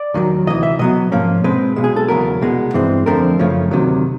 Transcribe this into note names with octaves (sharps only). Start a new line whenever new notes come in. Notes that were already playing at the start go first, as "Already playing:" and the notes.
Already playing: D5
D#2 D#3 F#3
D2 C3 E3 D#5
E5
B2 F#3 B3 D#5
G#2 F3 A#3 C#4
B2 G#3 C4 B4
B1 B2 G#3
G#4
A4
E2 C#3 F#3 B3 A#4
C2 B2 G#3 B3
G2 E3 G#3 C4
F2 D3 F3 A3 C4 A#4
F#2 C#3 F3 A3 C#4
D2 C3 D#3 F#3